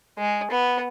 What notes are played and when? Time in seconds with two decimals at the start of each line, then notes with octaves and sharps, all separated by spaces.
0.18 G#3
0.51 B3